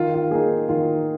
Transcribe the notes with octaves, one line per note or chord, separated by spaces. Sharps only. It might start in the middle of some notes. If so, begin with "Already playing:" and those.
Already playing: D#3 F4
F4
A#3 D#4 G#4
D#3 F4